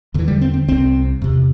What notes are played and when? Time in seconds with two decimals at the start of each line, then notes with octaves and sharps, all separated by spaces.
0.14 E2 D3 E3
0.28 G3
0.41 C4
0.54 C4
0.68 C2 C3 C4
1.22 E2 C3